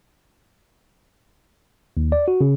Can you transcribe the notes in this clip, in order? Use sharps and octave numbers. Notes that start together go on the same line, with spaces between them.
D#2
D5
F#4
C#3